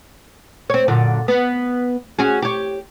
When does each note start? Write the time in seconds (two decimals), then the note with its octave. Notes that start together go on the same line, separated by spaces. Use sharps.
0.70 C4 C#5
0.88 F#2 A#2 D3
1.28 B3
2.19 C#4 F#4 G#4
2.42 G4 C#5